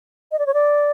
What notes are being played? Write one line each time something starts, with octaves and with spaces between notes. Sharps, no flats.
D#5
D5
C#5
D5